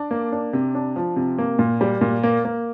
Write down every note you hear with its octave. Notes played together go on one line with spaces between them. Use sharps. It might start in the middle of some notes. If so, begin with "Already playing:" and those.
Already playing: D4
A#3
D4
C3
D4
F3
C3
A#3
A#2
G3
A#2
A#3
A#3